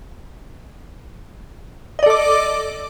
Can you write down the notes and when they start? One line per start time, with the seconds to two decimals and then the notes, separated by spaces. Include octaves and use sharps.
1.99 D#5
2.03 D5
2.06 A4
2.10 D6